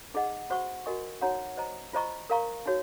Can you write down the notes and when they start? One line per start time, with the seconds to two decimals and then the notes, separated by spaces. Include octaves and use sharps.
0.14 D#4 G#4 D#5 F#5
0.50 F#4 C5 F#5 C#6
0.86 F#4 A#4 D#5 G#5 C#6
1.21 D#4 F#4 C#5 F#5 A#5
1.57 C5 D#5 A#5
1.93 F4 C5 D#5 A#5 C#6
2.30 A#4 F5 A#5 C#6
2.66 D#4 F#4 C#5